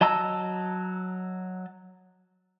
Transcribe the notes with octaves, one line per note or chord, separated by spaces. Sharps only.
F#3 D#5 A5 A#5 E6